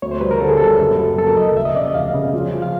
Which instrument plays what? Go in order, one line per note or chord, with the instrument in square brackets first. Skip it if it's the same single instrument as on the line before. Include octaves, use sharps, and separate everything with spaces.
[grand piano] D2 [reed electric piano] C#5
[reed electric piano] C5
[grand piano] G3 [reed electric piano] B4
[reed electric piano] A#4
[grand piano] D3 [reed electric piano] A4
[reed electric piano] G#4
[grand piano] G3 [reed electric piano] A4
[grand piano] F#1
F#3
[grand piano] F#1 [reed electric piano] A4
[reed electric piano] A#4
[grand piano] F#1 [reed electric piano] D#5
[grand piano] F1 [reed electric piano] E5
[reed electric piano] D#5
[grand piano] C#3 [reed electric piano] D5
[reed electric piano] D#5
[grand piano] F1 [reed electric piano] F5
[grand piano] C#3
F3
F3
[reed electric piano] F5